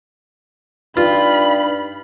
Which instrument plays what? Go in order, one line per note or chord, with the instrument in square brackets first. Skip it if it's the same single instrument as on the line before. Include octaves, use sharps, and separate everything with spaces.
[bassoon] G2 [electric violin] D#4 B5 [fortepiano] F4